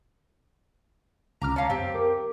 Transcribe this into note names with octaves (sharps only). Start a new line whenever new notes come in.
C#2 D3 A#5 D6 F6
C#4 F4 A5 A#5
F#2 C4 G4
A#4 D6